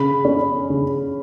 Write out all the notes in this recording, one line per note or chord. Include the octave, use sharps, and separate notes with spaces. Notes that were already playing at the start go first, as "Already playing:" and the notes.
Already playing: C#3 B5
C#4
C#3